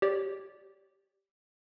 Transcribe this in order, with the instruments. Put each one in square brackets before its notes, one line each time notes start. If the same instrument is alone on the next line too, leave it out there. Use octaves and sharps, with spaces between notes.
[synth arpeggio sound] G4 C#5 D5